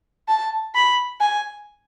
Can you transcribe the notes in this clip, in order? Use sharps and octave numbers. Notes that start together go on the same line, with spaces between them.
A5
B5
G#5